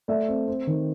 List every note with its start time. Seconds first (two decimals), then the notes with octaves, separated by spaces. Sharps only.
0.08 A3 D5 E5
0.28 C4
0.48 C4
0.67 D#3